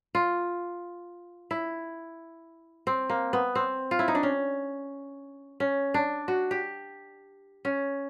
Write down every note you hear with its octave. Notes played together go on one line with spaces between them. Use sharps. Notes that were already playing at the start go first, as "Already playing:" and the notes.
F4
E4
C4
A#3
B3
C4
F4
E4
D#4
D4
C#4
C#4
D4
F#4
G4
C#4